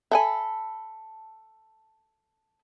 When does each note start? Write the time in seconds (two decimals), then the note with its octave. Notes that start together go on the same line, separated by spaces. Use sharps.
0.11 A4 E5 F#5 G#5 B5